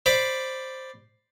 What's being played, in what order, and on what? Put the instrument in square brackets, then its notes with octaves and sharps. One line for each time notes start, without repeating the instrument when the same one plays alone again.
[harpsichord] C5 D5 B5 D6